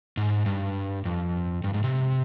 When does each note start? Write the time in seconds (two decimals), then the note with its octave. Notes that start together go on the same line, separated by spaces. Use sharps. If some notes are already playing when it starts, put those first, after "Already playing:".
0.17 G#2
0.46 G2
1.05 F2
1.64 G2
1.74 G#2
1.84 C3